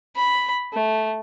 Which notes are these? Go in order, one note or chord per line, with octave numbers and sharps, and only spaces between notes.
B5
A3